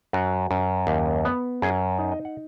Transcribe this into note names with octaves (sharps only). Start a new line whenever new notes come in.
F#2 F#4
F#2
D#2
B3
F#2 G#4
D#4
D#5
F#5